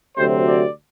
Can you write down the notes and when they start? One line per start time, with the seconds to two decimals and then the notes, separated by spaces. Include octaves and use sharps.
0.17 D2 C3 F#3 C4 C5
0.45 D5